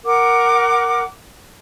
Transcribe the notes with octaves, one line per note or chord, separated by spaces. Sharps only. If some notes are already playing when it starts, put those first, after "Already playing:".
A#4 F#5 D6